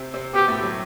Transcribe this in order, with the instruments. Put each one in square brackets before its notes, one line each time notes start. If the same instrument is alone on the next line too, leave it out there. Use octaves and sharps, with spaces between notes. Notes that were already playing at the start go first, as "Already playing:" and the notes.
Already playing: [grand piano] C3 C4
C3 C4
[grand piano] B2 B3 [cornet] G4
[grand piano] A2 A3
F#3